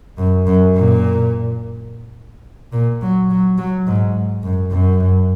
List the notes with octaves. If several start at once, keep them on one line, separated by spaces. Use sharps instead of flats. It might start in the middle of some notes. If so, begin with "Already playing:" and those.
F#2
F#2
A#2
A#2
F#3
F#3
F#3
G#2
F#2
F#2